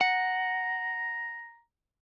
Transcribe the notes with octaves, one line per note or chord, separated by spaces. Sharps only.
F#5 A#5